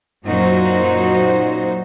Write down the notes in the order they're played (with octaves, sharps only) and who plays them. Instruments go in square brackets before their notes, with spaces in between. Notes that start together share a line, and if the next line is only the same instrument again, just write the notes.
[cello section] F#2 A#2 F#3 D#4 F#4 C5